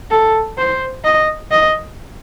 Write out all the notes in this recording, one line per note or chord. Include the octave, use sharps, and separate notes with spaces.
A4
C5
D#5
D#5